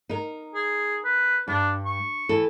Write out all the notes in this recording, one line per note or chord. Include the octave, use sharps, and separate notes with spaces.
D#4 A#4
G#4
B4
G2 D4
C#6
E3 A4